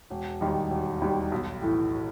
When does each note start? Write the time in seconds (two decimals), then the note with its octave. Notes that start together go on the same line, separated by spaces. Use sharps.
0.10 E1
0.41 D#2 D#3 G3
0.71 E1
1.02 D#2 D#3 G3
1.32 B1
1.62 A2 E3 A3